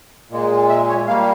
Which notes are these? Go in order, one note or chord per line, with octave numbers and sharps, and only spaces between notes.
A#2 G#3
E5
C#5
G3 A#3 F5